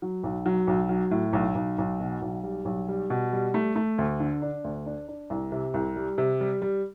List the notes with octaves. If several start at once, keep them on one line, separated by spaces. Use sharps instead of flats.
F#3
B1
F#3
B1
F#3
A2
B1
B1
B1
B2
B1
G3
B1
G3
B2
G3
A3
A3
D2
D3
D4
D2
D4
D4
C2
C3
C2
G3
C3
G3
G3